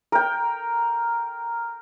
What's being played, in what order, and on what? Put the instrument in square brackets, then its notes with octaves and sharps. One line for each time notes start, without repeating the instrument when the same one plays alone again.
[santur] A#4 G5